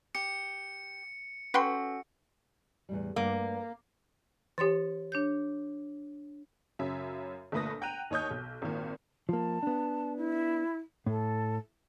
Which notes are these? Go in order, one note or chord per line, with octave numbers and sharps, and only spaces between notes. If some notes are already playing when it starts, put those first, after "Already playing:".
G4 C#7
C#4 F#4 A4 B4 G5 C6
E2 A2 G3
G2 A3 A#3 F#5
E3 G4 C#5 C6 A6
D4 C#5 G6
F#2 C#3 E5
G1 A#2 A3 B4 D#6 A#6
F#5 G5 A#5 F#6 D#7 F7
D#2 D#4 C#5 D#6 G6
B1
G#1 A#2 D#3
F3 A#3 A5
B3 D4
E4
A2 A4